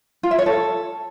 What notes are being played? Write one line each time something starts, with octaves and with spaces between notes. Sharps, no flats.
F4
E5
C#5
A4